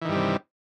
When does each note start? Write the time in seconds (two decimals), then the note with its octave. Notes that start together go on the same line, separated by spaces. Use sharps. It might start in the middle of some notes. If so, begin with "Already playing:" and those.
0.02 E3
0.05 D#3
0.08 G2
0.12 G3
0.15 C3